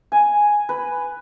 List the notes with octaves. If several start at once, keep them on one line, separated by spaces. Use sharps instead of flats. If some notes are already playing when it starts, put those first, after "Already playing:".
G#5
B4